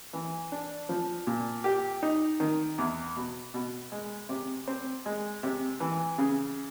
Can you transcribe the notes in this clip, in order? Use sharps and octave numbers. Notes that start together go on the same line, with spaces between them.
E3
D4
F3
A#2
G4
D#4
D#3
E2
B2
B2
G#3
C3
C4
G#3
C3
E3
C#3